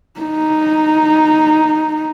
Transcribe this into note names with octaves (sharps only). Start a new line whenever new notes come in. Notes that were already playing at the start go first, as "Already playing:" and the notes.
D#4